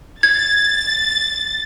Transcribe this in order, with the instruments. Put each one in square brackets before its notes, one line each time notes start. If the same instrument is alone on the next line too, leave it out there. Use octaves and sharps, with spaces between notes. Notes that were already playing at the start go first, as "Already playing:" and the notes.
[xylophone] G#6 [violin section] A6